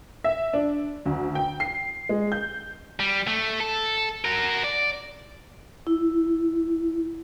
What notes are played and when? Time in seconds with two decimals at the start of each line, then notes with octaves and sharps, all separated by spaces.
0.24 E5
0.53 D4
1.05 D2
1.35 G5
1.60 C7
2.09 G#3
2.32 G6
3.00 G3
3.27 A3
3.60 A4
4.25 F#4 A#4
4.64 D5
5.87 E4